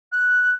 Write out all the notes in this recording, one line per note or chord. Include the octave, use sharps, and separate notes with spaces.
F#6